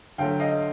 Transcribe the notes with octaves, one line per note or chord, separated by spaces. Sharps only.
D2 D3 F#3 A3 F5 G5
D#5 F5